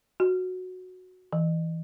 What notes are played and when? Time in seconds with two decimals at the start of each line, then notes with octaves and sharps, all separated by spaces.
0.20 F#4
1.33 E3